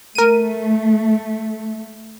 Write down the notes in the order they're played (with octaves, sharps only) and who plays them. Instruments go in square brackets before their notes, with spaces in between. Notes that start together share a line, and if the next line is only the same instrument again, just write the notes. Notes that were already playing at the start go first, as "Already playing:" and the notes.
[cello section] A3 [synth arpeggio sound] A#4 D#7